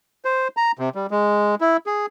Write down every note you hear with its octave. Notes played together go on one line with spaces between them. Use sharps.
C5
A#5
C3
G3
G#3
E4
G#4